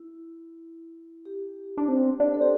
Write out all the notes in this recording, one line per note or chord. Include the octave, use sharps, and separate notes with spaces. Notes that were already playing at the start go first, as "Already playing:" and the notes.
Already playing: E4
G4
D4
C4
D4
A4
C4 G4